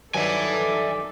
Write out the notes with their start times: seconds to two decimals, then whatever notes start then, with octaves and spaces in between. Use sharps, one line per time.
0.14 G2 D#3 F#3 D#4 A4 D5 E5 G#5